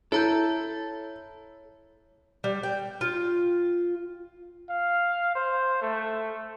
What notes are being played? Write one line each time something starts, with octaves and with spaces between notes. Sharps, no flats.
E4 A4 C#5 A#5 G6
G3
G5
F4
F5
C5
A3